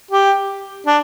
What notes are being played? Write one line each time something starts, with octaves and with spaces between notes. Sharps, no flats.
G4
D4